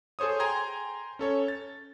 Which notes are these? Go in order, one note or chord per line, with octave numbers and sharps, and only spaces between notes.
G#4 A4 C5 C#5 D#6
G5 G#5 A#5 C6 G#6
C#4 A4 C#5
A6